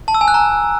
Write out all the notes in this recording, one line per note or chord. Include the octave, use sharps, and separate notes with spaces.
A5
E6
G#5
F#6
A#5